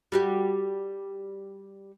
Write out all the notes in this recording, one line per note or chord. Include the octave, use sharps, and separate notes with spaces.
G3 F#4 G4